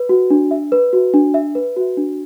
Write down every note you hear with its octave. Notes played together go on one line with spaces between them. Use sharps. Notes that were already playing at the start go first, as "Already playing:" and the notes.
Already playing: B4
F#4
D4
E5
B4
F#4
D4
E5
B4
F#4
D4